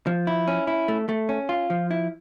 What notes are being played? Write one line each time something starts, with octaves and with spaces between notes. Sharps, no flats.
F3
E4
C#4
E4
A3
A3
C#4
F4
F3
E4